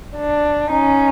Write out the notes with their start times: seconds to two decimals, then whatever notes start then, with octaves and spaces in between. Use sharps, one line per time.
0.15 D4
0.70 C#4 D#4